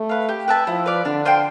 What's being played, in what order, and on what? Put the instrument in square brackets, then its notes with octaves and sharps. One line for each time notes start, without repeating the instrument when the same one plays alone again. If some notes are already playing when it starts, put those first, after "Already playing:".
Already playing: [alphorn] A3
[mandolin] B4 F5
G4
B4 E5 A5
[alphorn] F3 [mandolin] E4
[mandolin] B4 D5 F5
[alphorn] D3 [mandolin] D4
[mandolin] F4 C5 G5